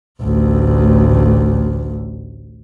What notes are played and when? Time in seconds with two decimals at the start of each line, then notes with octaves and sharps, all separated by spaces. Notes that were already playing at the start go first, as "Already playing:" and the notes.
0.22 A1 D2